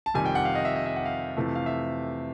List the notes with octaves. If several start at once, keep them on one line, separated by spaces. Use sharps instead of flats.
A5
F2 C3 D#3 G3 G#5
G5
F#5
F5
D#5
E5
D#5
E5
F#5
F5
F2 C3 E3 A3
F5
E5